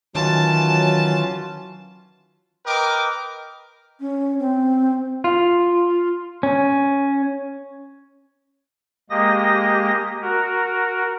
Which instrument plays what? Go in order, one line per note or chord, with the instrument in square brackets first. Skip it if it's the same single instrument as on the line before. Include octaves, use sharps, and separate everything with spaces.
[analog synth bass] D#3 [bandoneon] E3 C#4 F4 [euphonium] F#3 [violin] A5
[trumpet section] A#4 B4 D#5 G5 D6
[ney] C#4
C4
[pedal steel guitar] F4
C#4
[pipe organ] G#3 A#3 G4 D#5 D#6 A#6
F#4 A#4